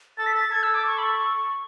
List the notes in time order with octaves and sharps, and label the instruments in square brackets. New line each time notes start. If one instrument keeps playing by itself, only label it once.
[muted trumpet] A4 [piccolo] A6
[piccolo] B6
A6
[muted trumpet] A4 [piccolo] G#6
[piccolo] E6
D6
C#6
B5
C#6